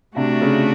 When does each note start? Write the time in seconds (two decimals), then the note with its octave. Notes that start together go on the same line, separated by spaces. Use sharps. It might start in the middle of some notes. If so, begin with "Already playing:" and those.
0.15 C3 A3 D4 F#4
0.41 C#3